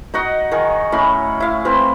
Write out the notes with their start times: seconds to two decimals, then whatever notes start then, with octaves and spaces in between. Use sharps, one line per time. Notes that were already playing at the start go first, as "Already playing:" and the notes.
0.14 D#4 F#4 D#5 F#5
0.51 D#3 G#4 A#4
0.92 A2 C#4 B5
1.40 E4 F5
1.65 C4 B4 F5